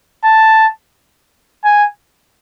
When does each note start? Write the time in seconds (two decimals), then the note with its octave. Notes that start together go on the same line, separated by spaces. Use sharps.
0.25 A5
1.64 G#5